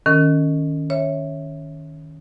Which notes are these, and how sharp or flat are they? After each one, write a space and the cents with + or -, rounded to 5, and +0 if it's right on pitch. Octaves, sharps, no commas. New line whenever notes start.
D#3 +0 C#4 +5 A#4 -40
C#5 -10 E5 +0